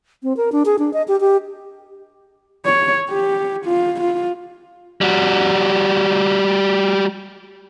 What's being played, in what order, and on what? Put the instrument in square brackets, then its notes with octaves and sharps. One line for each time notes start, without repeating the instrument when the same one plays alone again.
[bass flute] C4
A#4
D4
G#4
D4
D#5
G4
G4
[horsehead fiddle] C#5
G4
F4
F4
[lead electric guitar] G3 F#4